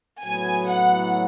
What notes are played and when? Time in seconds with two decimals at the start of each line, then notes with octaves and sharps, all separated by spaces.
0.22 A2 F#3 B3 G#5
0.69 F#5